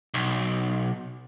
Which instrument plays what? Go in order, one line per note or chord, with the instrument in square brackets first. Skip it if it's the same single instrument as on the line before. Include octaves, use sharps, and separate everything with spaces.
[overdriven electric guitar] B1